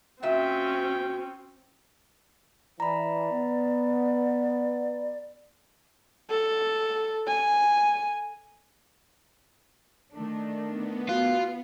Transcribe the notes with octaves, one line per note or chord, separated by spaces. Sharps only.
A#2 C4 C#4 F#4 E5 G5
E3 D5 A#5 B5
B3
A4
G#5
D#3 A3 D4
B3
F4 F#4